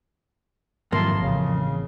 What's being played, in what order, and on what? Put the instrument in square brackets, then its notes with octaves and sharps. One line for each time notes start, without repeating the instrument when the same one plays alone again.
[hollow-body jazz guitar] F2 A#3 [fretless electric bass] G#2 D#3 F#3 [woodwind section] E4 A5 C6
[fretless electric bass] A1 [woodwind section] C#3